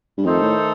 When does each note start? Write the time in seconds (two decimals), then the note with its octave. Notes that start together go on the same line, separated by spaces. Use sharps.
0.18 G2
0.25 F2 D#3 A3 D#4 A4 C5
0.41 A2